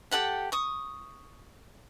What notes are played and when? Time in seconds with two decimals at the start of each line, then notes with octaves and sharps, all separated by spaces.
0.11 G4 A4 F#5 G5
0.52 C#6 D#6